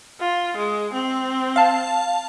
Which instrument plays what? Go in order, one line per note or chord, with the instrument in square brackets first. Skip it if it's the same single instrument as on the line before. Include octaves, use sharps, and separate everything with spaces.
[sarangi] F4
G#3
C4
[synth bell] F5 A5